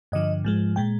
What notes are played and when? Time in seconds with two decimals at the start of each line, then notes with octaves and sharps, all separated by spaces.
0.12 G2 D3 F3 D#5
0.44 G#2 F3 G#3
0.76 A#2 G#3 G5